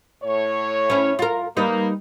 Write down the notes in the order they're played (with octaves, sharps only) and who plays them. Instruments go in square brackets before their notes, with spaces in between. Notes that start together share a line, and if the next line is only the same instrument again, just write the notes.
[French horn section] A2 C#5
[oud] C#4 E4
F4 A#4
[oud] G3 D#4 B4 [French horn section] A#3